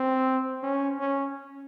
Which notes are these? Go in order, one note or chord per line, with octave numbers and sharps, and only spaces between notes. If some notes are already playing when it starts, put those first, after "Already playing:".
Already playing: C4
C#4
C#4